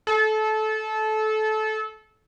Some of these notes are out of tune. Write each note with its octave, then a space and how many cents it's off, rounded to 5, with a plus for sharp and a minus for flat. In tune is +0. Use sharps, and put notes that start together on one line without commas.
A4 -25